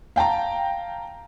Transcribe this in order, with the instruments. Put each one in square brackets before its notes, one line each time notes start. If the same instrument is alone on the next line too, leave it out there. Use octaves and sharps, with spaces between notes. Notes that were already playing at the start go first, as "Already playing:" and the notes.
[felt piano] F5 G5 A5 A#5